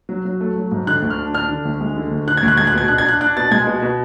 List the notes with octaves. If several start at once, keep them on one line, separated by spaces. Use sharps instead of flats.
F#3
F#3
A3
F#3
G#2
D3 F#6
D2
F6
D4
D4 F6
D3
D2
G#3
D3
D2
D3 F#6
G#6
D2
F#6
G#3 G#6
F#6
B2 G#6
D4 F#6
G#6
D4 F#6
D4 F#6
B2 A6
G#3 G#6
B2
B2